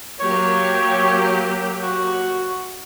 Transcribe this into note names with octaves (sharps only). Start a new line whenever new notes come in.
F#3 A#3 G4 C#5
F#4